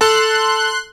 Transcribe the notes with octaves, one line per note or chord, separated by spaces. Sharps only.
A4 A5 C6 F#6